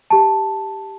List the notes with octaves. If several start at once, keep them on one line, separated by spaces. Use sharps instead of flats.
G4 A5